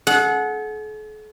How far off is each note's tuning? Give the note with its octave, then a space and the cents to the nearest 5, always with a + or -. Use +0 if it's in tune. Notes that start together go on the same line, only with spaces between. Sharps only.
A4 -45 F#5 -10